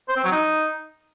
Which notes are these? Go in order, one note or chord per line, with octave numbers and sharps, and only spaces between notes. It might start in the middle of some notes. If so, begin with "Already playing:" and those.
C5
C4
F#3
D#4